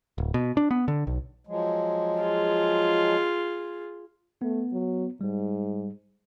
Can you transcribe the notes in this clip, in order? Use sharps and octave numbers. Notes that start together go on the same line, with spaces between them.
D1
B2
D4
B3
D3
B1
F3 F#3 G#3
F4 G#4
A3 B3
F#3
G#2 G3